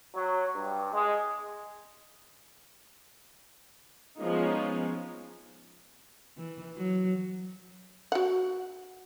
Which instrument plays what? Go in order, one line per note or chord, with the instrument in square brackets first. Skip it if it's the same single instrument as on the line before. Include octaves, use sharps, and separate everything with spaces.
[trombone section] F#3
G2
G#3
[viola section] F3 G#3 B3 C#4 D#4 F4
[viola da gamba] E3
F#3
[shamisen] F#4 F#5